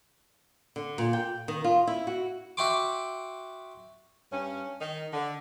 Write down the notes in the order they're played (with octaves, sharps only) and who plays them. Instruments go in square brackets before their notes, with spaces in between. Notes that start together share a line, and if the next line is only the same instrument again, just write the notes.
[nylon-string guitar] D3
A#2
G5
D#3
F4
E4
F#4
[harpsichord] F#4 E5 G5 C6 D6
[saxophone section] G2 C#4
D#3 D#4
D3